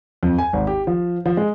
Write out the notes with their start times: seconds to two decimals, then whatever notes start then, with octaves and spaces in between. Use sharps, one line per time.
0.23 F2
0.38 G#5
0.53 G#1
0.67 G4
0.87 F3
1.26 F3
1.37 G#3